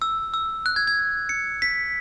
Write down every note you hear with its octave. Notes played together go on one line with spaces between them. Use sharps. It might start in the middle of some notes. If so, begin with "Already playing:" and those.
E6
E6
F#6
G#6
G#6
C#7
B6